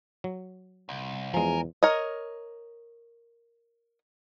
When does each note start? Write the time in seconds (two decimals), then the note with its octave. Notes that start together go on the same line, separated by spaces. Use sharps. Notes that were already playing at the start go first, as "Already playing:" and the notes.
0.24 F#3
0.89 C2
1.34 E2 F3 G#3 A#4 G#5
1.83 A#4 C#5 D#5